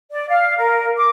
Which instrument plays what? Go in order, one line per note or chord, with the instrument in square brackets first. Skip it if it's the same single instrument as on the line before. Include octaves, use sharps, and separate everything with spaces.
[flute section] D5
F5
A#4
D6